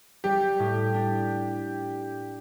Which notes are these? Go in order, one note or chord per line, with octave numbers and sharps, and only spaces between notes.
G3 G4
A2
D4